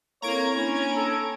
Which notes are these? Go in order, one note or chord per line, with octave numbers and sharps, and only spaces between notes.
A#3 C4 E4 A4 C#5 A#5 G#6 D7
A#3 C#4 D4 C#5 B5
A4